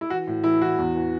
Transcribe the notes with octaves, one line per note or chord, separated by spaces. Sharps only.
E4
E3 F#4
A2
E3 E4
E3 F#4
E2
E3